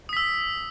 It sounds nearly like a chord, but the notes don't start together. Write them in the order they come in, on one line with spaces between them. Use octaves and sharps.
D#6 B6 E6